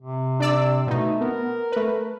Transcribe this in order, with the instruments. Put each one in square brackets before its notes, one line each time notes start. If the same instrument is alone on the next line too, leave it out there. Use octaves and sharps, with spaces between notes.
[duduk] C3
[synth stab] D4 D5 E6
[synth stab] B2 D#4 [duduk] A3
[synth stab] B3 [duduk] A#4
[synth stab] A3 B4